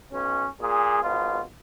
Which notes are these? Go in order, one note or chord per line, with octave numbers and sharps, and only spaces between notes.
B1 C#4
A#2 G#4
G#1 B2 F4